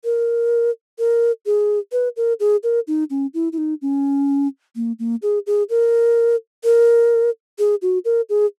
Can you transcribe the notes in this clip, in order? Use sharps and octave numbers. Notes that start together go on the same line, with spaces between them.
A#4
A#4
G#4
B4
A#4
G#4
A#4
D#4
C#4
E4
E4
D#4
C#4
A#3
A#3
G#4
G#4
A#4
A#4
G#4
F#4
A#4
G#4